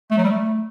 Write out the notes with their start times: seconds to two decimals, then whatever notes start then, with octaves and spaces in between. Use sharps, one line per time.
0.11 A3
0.17 F#3
0.24 G3
0.30 A3